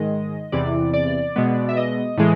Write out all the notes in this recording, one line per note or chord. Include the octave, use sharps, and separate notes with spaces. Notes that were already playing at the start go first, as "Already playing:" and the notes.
Already playing: G#2 D#3 G#3 D#5
E2 C3 E3 D5
D5
B2 G#3 B3
E5
D#5
A2 E3 G#3